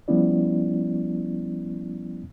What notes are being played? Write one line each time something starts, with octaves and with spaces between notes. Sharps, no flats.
F3 G3 B3 C#4 E4 D5